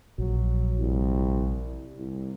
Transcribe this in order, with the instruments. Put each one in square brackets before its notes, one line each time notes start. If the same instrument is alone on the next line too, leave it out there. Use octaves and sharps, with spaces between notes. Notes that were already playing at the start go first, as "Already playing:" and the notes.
[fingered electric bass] A#1 [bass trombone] F#3
[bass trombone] C2
C2